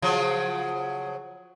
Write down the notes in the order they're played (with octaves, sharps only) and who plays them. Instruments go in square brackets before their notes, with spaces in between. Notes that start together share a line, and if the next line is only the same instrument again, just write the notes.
[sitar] C#3 F3 F#3